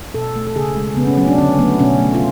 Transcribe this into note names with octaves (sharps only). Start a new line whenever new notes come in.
B2 A4
A3
A4
C#3 G#4
G#3
C#3 B3
C#4
F#3 A3 C#4
D4
D3 C#4
F#3 A3 B3
B2 C#4
A3
F4